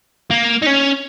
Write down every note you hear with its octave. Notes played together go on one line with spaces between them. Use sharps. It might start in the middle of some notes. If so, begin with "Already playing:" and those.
A#3
D#4
C#4